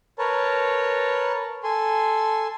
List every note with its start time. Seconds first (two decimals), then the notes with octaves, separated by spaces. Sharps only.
0.19 A#4 B4 C#5 A5
1.63 A4 G#5 C6